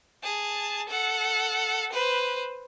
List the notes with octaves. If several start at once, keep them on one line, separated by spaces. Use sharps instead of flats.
G#4 A5
A4 F#5
B4 C5